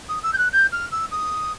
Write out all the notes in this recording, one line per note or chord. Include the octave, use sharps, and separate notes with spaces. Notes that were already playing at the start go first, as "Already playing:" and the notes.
D#6
E6
G6
F#6
G6
F6
E6
D#6